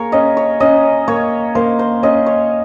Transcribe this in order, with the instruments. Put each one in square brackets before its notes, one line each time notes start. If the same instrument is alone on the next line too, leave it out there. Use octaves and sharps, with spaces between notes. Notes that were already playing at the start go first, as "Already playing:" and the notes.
Already playing: [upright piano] A#3 G#4 [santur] A#4 C#5
[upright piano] C#4 [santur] D#5
[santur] C#5
[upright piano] C#4 [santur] D#5
[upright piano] A#3 [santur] C#5
[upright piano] A#3 [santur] C5
[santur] C5
[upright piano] C#4 [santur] D#5
[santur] C#5